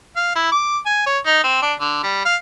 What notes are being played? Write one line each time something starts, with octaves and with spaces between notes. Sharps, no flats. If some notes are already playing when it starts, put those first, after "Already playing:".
F5
E4
D6
G#5
C#5
D#4
C4
D4
D3
G3
F5